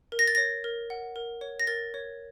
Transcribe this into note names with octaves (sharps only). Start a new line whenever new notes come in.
A#4
A#6
A6
C#5 A#6
A#4
F#5
A#4
C#5
A#6
A#4 A6
C#5